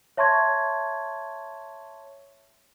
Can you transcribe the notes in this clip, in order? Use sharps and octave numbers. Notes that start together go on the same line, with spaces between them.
C#5 E5 A5 C6 C#6 G#6